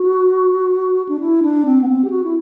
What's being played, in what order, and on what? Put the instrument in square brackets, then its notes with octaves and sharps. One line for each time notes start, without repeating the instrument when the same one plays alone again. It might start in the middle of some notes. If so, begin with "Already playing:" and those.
Already playing: [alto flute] F#4
D4
E4
D4
C4
B3
C4
G4
F#4
E4